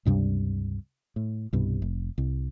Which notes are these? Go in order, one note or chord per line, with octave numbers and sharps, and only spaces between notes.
C#2 G2 C3 G3
A2
C2 G2 B2
F1
C2